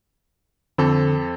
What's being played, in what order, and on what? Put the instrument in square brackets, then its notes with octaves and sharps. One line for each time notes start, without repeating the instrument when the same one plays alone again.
[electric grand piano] F2 C4 A4 [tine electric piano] D3